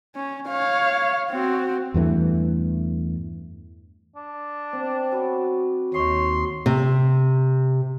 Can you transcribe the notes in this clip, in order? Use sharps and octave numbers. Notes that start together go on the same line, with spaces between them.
C#4
C#5 F5
C4 F#4
E2 G2 E3 A3
D4
C4
F#3 B3 F#4
D#2 D#4 C#5 C6 D#6
C3